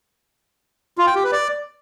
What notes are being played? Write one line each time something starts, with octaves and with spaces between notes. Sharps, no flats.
F4
G5
G4
B4
D5